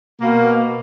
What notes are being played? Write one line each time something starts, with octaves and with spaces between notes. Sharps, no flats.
B2 A#3